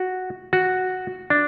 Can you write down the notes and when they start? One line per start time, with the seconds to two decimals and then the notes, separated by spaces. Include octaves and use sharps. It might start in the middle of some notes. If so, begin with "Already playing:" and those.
Already playing: F#4
0.53 F#4
1.30 D4